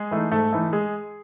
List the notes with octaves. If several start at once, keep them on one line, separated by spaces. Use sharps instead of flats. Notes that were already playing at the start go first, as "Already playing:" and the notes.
Already playing: G#3 G#4
E3 A3 D#4
G#2 A3 A4
E3 A3 D#4
G#3 G#4